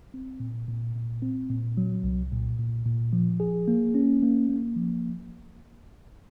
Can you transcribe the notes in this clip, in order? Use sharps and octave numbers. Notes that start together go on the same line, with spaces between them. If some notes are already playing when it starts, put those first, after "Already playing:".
C4
A#2
A#2
A#2
C4
A#2
F#3
C2
A#2
A#2
A#2
F3
G#4
A#3
C#4
A#3
A#3
F3